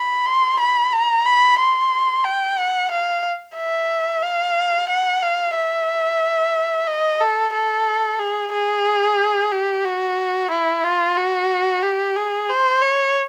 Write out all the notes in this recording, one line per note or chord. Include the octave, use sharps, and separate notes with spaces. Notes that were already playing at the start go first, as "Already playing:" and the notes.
Already playing: B5
C6
B5
A#5
B5
C6
G5
F#5
F5
E5
F5
F#5
F5
E5
D#5
A4
A4
G#4
G#4
G4
F#4
E4
F4
F#4
G4
G#4
C5
C#5